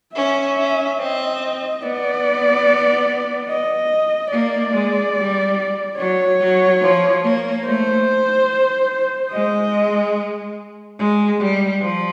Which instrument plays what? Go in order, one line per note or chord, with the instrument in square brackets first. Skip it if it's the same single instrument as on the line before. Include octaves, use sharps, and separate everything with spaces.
[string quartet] C#4 [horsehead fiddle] E5
[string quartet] C#4
[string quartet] C4 [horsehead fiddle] D#5
[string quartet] B3 [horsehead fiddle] D5
[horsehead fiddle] D#5
[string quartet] A#3 [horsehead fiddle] D5
[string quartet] G#3
G3
[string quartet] F#3 [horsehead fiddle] C#5
[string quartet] F#3
F3
A#3
[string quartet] A3 [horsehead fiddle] C5
[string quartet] G#3 [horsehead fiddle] D#5
[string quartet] G#3
G3
F3